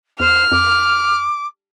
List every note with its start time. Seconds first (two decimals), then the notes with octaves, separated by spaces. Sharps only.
0.20 E2 C5 F6
0.52 F2 D6